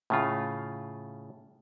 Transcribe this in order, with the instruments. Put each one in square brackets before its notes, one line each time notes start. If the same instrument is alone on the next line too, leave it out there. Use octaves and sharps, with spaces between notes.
[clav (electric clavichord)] A2 C#3 F4